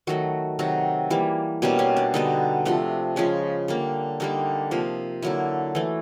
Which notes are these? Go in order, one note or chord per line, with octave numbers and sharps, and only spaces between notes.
D#3 F#3 A3 F#4
C3 D#3 F#3 F#4
E3 G3 A#3
B2 G3 A#3 C#4
C#4
D4
D3 G3 B3 D#4
C3 F3 A3 D4
C#3 F3 G#3 C#4
D3 G3 A#3
D3 G3 A#3 D#4
C3 F3 A#3
D3 F#3 A#3 E4
E3 A3